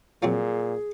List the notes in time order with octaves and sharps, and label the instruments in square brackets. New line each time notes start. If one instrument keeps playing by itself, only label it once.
[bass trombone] A#2 [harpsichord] F3 F#3 C4 [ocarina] G#4